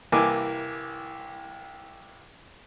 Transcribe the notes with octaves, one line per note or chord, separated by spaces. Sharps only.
C2 E3 A#3 G#5 D6